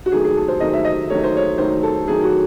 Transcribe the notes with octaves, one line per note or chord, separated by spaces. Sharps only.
F#4
D#3 F#3 A3 G#4
G#4
A4
C5
D#3 F#3 A3 D#5
E5
D#5
D#3 F#3 A3 C#5
C5
C#5
D#3 F#3 A3 C5
A4
D#3 F#3 A3 G#4
F#4